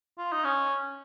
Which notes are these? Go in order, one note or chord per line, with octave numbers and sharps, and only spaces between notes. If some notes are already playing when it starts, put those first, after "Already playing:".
F4
D#4
C#4